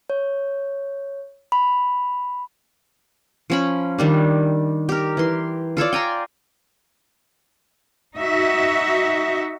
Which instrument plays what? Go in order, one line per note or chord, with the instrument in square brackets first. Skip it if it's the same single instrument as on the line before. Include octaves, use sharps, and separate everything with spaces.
[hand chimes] C#5
B5
[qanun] F3 C#4 B5
D#3 G3 D4
G4 A#4
E3 C6
F4 A4 C#5 D5
G5 G#5 A#5 C6
[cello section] D#4 F#4 E5